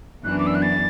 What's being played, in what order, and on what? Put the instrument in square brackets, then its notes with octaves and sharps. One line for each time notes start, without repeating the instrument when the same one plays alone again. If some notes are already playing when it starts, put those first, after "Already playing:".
[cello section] F#2 E3 B3 D4 [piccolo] F#6
[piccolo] D6
E6
F#6
A6